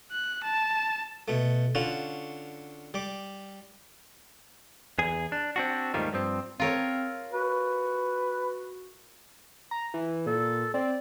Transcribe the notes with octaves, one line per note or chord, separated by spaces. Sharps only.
F#6
A5
B2 A3
D3 C#4 F4 F#4
G3 D6
E2 G#4
D4
C4 D4 F#4
D#2 G#2 D#3 G3 A3 F4
G2 F3 C4
C4 F4 A#4 C#5
F#4 B4
A#5
E3
A#2 A4
C4 D5